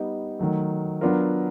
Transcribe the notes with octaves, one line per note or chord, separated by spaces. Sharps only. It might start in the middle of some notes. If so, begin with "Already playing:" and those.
Already playing: G3 B3 D#4 G4
D#3 F#3 A3
F#3 B3 D4 F4 A#4